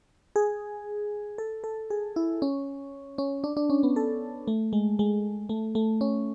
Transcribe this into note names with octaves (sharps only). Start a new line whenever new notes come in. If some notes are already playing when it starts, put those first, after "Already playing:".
G#4
A4
A4
G#4
E4
C#4
C#4
D4
D4
C#4
B3
A4
A3
G#3
G#3
A3
A3
C#4